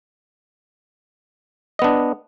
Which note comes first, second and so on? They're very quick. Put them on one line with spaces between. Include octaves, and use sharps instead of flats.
D#5 B3 D4